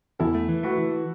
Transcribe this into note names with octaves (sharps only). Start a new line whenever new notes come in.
E2 E4 A4
A3
E3
A3 F#4 B4
E3